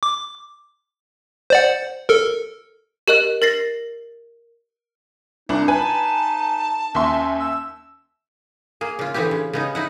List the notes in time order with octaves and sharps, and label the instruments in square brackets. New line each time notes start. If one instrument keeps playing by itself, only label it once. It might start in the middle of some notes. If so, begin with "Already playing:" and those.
[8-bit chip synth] D6
C5 D5 F#5
A4 A#4
[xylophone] G4 A#4 D#5 F#6
A#4 A6 A#6 C7
[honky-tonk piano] C2 D4 [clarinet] D#4
[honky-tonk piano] B4 G#5 B5 [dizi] A5
[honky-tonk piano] D#2 E5 C6 [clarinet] C#4
[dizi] E6
[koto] A#3 G#4
C#3 F4
D3 E3 B3 C4 E4 G4
C#3
C#3 B3 D#4
D#4 E4 F#5